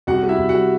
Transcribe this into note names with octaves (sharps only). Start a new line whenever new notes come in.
C2 F#4 F#5
G3
E4 E5
C2
F#4 F#5
G3